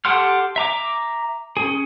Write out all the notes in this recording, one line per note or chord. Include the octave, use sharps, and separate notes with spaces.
G4 A4 F#5 C6 F6
E5 A#5 D6
C#4 G#4